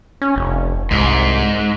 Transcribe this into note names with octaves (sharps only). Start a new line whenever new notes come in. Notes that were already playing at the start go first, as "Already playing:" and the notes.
C#4
F1
C2 G#2